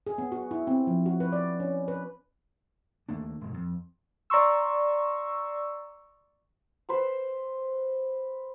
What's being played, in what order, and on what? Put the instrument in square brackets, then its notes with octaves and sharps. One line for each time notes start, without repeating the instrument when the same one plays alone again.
[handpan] G#4
B3
F#4
E4
C4
F3
F#4
B4
D5
C#4
B4
[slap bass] D#2 A3 A#3 D4
E1 G#2 B2
F2
[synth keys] D5 A#5 C6 C#6 E6
[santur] B4 C5 E6